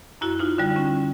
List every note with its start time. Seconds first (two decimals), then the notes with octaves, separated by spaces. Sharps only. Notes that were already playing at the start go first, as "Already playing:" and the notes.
0.21 F#2 E4 F#4
0.39 D#4 F4
0.58 D3 G3
0.76 C#4